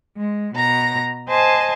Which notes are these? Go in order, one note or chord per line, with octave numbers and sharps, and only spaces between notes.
G#3
B2 A#5 A#6
C5 D#5 G#5 A5 C6